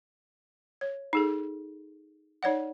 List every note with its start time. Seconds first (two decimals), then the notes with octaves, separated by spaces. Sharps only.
0.81 C#5
1.13 D#4 G#4 A4
2.43 D#4 C#5 D5 F#5